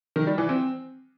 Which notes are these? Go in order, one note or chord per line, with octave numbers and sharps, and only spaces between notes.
D#3
G3
E3
C4